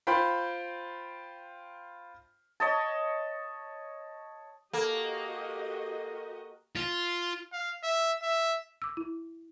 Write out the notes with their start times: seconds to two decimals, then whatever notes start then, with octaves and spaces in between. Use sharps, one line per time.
0.07 F4 C5 G5 B5
2.60 C#5 D#5 A5
4.73 A#3 F#4 G4 A4 D#5
6.76 F4
7.53 F5
7.83 E5
8.23 E5
8.82 D6 E6
8.97 E4